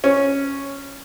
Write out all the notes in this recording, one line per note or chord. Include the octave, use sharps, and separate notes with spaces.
C#4